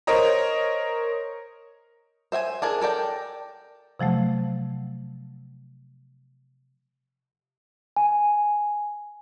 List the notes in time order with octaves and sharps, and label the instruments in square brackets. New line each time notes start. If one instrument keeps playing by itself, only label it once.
[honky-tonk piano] A#4 C5 C#5 D#5 A#5
[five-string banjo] C5 E5 G5 G#5
D4 G#4 A#4
A4 A#4 D5 G5
[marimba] C3 F3 F#3 A3
[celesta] G#5